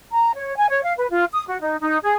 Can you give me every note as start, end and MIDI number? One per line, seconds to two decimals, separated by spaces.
0.11 0.31 82
0.34 0.54 73
0.56 0.68 80
0.68 0.80 73
0.83 0.93 77
0.96 1.06 71
1.10 1.24 65
1.32 1.43 87
1.48 1.59 66
1.61 1.76 63
1.81 1.98 63
2.03 2.16 68